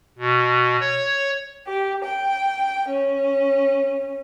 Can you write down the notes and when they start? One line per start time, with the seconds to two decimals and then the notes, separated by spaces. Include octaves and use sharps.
0.18 B2
0.81 C#5
1.66 G4
2.03 G5
2.88 C#4